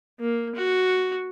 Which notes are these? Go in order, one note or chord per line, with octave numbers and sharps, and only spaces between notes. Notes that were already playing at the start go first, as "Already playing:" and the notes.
A#3
F#4